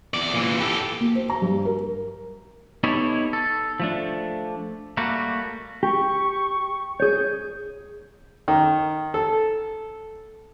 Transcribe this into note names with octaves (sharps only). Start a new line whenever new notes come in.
E2 D5
A#2 E3
G4 A4
A#3
C5
A#5
G2
A#4
B3 D#4 E4 G4 A4 C#5
A4
F3 A3 D4
G3 A3 A#3 F#4
G4 C#6
G#4 C#5 G6
D#3
A4